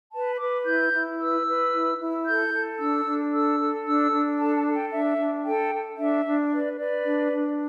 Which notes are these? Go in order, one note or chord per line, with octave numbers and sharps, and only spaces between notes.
B4 A5
B4 D6
E4 G6
E4
B4 E6
B4
E4
E4
A4 G6
A4
D4 E6
D4
A4 E6
A4
D4 E6
D4
A4 A5
A5
A4
G5
D4 E5
D4
A4 G5
A4
D4 E5
D4
B4 D5
B4 D5
D4
D4